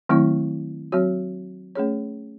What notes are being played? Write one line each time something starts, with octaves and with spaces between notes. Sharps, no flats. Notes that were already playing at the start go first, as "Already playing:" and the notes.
D#3 F#3 A3 C4 E4
F#3 C4 F#4 C#5
A3 C#4 G#4 C#5